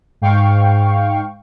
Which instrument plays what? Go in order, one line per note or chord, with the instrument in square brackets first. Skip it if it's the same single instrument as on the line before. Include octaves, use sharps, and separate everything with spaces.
[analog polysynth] G#2 F5 G5 C#6